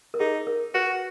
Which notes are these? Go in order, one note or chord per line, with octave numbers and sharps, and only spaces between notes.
A#4
D#4 G#4
A#4
F#4 B4